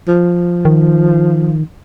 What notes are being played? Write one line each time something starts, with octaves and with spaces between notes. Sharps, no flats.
F3
D#3